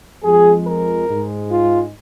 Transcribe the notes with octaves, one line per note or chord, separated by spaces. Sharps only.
F2 F3 G#3 G#4
A#4
G#2 G#3
F4